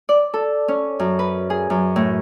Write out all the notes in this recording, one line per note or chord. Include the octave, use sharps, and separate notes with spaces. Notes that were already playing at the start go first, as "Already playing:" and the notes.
D5
A4
C#4
F#2
B4
G#4
F#2
A2